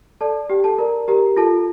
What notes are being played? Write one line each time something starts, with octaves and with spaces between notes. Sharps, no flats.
A4 D5 A5
G4 G5
A4 A5
A#4 D5 A#5
G4 A#4 A#5
F4 A4 A5